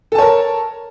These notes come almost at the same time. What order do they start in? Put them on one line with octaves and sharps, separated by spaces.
A4 A5 C#5 A#4